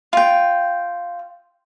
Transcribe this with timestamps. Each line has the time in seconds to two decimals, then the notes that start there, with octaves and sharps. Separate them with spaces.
0.13 F4 G5